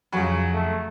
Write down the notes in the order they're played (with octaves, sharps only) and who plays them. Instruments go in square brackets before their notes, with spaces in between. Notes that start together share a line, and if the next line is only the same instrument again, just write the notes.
[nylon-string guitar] F2 G#5 [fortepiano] C#3 F#3
[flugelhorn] A3